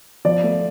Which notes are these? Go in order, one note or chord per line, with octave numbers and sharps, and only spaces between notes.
F3 D5
A3